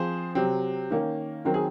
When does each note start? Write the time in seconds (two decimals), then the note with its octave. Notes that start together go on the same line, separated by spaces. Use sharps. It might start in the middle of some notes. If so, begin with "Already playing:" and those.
Already playing: F3 C4 G#4 C5
0.35 C3 F#3 C4
0.90 D#3 A#3 C#4
1.45 D#3 F#3 C4 A#4
1.54 G#4